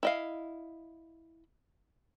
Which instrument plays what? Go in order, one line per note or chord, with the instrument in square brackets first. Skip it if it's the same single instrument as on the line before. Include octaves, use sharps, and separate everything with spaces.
[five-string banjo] E4 D#5 F5